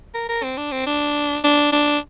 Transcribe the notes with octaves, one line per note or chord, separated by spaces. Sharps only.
A#4
A#4
C4
D4
C4
D4
D4
D4